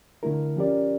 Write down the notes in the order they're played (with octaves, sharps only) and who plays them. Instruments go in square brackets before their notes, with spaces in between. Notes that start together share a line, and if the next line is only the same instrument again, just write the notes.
[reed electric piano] D3 A3 E4 A#4
F3 C#4 G4 A#4 D5